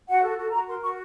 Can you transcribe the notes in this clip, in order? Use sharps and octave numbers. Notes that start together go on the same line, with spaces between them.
F#4 F#5
A4
F#4
F#4 A#5
A#4 C6
F#4 C#6